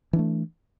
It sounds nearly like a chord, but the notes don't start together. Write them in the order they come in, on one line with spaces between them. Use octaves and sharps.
E3 D4 A3